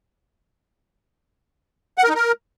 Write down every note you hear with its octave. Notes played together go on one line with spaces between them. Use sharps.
F#5
A#4
D#4
A#4